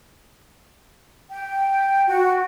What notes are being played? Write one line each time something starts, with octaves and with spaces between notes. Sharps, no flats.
G5
F#4